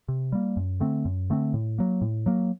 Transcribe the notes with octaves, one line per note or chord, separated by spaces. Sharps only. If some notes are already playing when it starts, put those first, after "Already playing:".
C3
G3 A#3
F#2
D3 A3 C4
F#2
D3 A3 C4
A2
F#3 A#3
A2
F#3 A#3